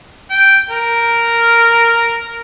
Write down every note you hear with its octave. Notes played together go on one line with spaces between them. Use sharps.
G5
A#4